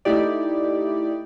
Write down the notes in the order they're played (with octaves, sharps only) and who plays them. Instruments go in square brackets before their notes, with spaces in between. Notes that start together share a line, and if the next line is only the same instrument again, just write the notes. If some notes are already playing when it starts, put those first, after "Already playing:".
[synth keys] A3 D#4 E4 G4 D5